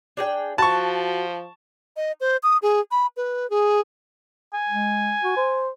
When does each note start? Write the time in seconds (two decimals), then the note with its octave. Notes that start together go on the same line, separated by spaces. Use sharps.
0.17 D4 G#4 G5
0.58 F3 F#4 A5 C#6
1.97 D#5
2.21 C5
2.43 D#6
2.62 G#4
2.91 B5
3.17 B4
3.50 G#4
4.54 G#5
4.69 G#3
5.23 F#4
5.37 C5